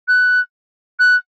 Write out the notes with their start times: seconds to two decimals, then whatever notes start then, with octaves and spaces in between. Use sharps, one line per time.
0.08 F#6
0.99 F#6